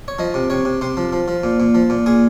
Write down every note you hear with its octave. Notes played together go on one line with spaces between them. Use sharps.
C#5
F3 D#5
C3
C3 C#5
C3
C3 C5
F3
F3
F3
A#2
A#2
F3
A#2
A#2 G#4